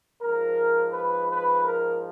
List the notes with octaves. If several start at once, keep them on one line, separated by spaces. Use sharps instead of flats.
G#2 F3 A#4
B4
B4
A#4